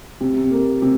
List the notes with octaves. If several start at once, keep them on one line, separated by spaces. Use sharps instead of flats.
C3
A#3
C3